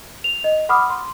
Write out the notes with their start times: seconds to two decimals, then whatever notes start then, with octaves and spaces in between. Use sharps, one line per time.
0.24 F7
0.44 D#5
0.69 F#5 B5 D6 D#6 F6
0.90 C6